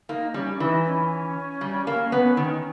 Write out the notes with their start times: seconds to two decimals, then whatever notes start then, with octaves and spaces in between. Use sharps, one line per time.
0.09 A#3 D#4
0.34 G3 C#4
0.60 E3 D#4
0.86 C#4
1.61 G3
1.87 A#3
2.12 B3
2.37 D#3